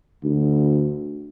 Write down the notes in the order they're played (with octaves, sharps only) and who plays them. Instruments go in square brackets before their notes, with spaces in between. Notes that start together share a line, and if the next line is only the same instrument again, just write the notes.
[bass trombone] D2